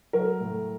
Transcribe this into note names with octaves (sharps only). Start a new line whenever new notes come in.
F#3 A#4
A2